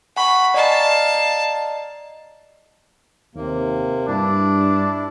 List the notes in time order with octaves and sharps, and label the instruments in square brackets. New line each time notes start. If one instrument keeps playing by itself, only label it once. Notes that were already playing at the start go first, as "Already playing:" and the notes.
[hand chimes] F#5 G#5 C#6 [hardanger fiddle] B5
[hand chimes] D5 D#5 A#5 [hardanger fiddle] F5 A5
[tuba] D#2 [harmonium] C3 A#3
[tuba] G2 [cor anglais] D4 [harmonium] E4